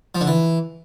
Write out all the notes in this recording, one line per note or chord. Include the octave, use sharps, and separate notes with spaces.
F3
D3
E3